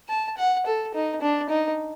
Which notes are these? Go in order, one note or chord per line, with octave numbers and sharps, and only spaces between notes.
A5
F#5
A4
D#4
D4
D#4